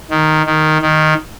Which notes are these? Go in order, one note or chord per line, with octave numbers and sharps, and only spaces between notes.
D#3
D#3
D#3